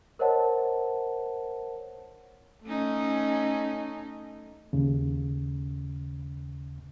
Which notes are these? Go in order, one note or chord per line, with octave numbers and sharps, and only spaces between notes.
A#4 C5 C#5 D#5 F#5 A5
A3 C#4 D#4
D#2 C#3